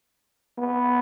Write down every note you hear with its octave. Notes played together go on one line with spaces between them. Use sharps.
B3